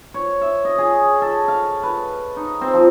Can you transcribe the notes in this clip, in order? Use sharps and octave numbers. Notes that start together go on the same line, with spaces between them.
C#5
E5
D#5
G#4
A4
F5
B4
D#4
C4
F3